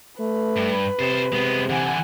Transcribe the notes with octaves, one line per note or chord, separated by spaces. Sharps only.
A3 B4
G2
C3 A4 C5
C3 G#3 B3
D3 E3 F#5 G#5